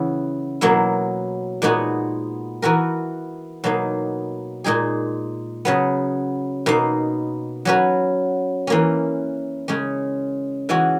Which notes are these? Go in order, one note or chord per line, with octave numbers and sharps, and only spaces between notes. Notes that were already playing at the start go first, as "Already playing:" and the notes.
Already playing: C#3 E3 B3
B2 F#3 A#3 E4
A#2 G#3 B3 D#4 F#4
E3 B3 F#4 A#4
B2 F#3 A#3 D#4
A#2 G#3 D#4 G#4
C#3 F#3 B3
B2 A#3 D#4
F#3 C#4 F#4 B4
E3 A#3 C#4
C#3 G#3 C#4
E3 G#3 C#4 F#4